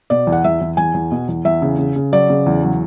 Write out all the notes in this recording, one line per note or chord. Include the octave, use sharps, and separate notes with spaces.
B2 D5
E2
F#5
E2 E5
E2
E2 G#5
E2
B2
E2
E2 E5
C#3
C#3
C#3
F#3 D5
C#3
E2
F#3